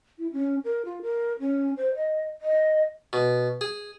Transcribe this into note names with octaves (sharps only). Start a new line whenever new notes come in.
E4
C#4
A#4
F4
A#4
C#4
C5
D#5
D#5
B2
G#4